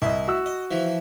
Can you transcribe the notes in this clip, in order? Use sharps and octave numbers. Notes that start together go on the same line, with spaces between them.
C2 E4 D#5
F#4 E6
D#5
E3 F3